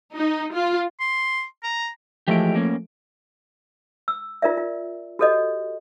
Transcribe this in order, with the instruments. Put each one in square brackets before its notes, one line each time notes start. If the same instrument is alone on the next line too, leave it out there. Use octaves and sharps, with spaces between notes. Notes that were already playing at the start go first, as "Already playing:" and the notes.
[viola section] D#4
F4
[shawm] C6
A#5
[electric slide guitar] E3 G#3 G4 [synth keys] F3 A3 D7
[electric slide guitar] A#3 C#4
[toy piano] E6
F4 A#4 D5 E5
F4
F#4 G4 A4 C#5 D#5